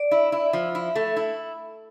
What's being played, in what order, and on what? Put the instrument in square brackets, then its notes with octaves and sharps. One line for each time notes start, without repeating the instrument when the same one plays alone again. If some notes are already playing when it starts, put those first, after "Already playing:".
Already playing: [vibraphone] D5
[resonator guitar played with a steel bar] E4
E4
F3
E4
A3
E4